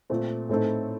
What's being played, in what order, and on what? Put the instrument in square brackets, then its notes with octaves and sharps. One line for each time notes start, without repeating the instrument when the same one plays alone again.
[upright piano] A#2 A3 C4
A2 A3 C4 D#4 A4